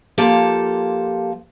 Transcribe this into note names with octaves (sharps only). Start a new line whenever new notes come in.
F3 A#3 F4 G4 A4